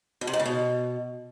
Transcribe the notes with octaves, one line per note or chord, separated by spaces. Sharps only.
B2
C3
G#2
C#3
B2